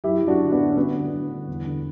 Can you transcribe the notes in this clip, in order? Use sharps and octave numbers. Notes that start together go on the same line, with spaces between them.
F#2 E4 G4
F#2
D4 F#4
D3
B3 D4
D3
C#4
G2 B3
D3
G2
D3
E2
D3